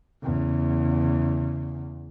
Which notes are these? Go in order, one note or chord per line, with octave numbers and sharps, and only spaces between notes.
E2 C#3